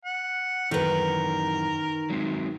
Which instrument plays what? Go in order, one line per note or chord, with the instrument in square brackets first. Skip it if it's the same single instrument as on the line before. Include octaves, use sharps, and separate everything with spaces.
[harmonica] F#5
[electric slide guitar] F#2 E3 [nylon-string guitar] D#3 B4 [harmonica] A#4
[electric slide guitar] F#3 G#3 C4